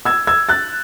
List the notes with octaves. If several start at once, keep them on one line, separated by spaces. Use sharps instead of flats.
E6 G#6
E6 G#6
F#6 A6